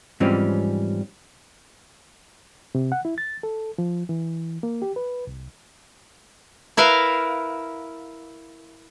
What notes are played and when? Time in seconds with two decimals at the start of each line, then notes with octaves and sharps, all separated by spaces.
0.20 G#2 E3 F3 G3 C4 C#4
2.75 C3
2.92 F#5
3.05 E4
3.18 A6
3.43 A4
3.78 F3
4.09 E3
4.63 A#3
4.82 G4
4.96 B4
5.27 C2
6.77 E4 A#4 B4 F5